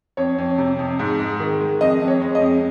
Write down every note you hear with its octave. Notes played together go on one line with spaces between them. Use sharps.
F2 C#5
F2
C3
F2
G#2
G#3
D#3
G#3
F2 D#5
F2
C#5
G#3
D#5
F2